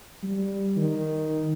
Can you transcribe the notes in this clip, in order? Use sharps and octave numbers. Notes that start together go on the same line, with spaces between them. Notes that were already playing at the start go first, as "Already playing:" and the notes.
G3
D#3